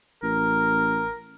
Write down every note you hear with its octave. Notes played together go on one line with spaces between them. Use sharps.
A1 A#4